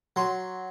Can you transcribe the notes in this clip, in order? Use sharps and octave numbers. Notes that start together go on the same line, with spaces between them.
F#3 C6